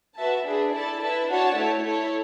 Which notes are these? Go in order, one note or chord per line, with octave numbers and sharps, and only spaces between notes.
F#4 B4 E5 A5
D4 G#4 B4 E5
E4 A4 D5 A5
E4 B4 E5 A5
D4 F#4 C#5 F#5 A5
A3 E4 A4 C#5
E4 A4 C#5